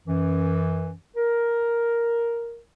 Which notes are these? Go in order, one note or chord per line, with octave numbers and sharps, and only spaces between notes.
F#2 E3
A#4